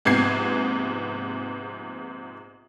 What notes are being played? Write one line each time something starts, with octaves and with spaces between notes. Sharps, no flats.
A#1 G#2 C3 B3 G#6 C7